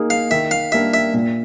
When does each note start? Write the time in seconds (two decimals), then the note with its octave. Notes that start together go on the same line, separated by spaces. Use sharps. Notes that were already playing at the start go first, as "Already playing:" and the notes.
Already playing: A#3 D#4 G#4
0.10 F5
0.31 D#3 E5
0.51 F5
0.72 G3 A#3 D4 E5
0.94 E5
1.14 A#2